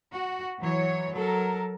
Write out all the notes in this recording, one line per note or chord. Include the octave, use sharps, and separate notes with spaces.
F#4
E3 F#3 C#5
F#3 A4 A#4